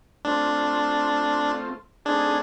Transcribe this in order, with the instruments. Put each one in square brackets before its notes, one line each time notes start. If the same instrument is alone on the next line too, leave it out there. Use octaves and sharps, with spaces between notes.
[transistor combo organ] A3 C4 F4 [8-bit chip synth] D4
[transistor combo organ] A3 C4 D#4 G#4 [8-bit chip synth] D4